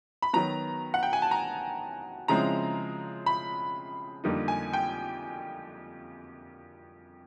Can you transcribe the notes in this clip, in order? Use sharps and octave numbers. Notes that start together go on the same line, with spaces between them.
B5
D#3 F#3 B3 A#5
F#5
G5
G#5
A5
A#5
C#3 F3 G#3 C4 E4 A#5
B5
F2 D3 G3 A#3 D#4
G#5
G5